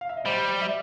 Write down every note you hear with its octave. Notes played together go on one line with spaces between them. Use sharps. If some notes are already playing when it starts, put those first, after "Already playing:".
F5
E5
D#5
G3 C5 D5
E5